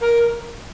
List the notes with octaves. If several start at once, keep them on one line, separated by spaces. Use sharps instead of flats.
A#4